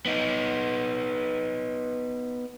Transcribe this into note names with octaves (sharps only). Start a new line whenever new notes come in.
B3 D#4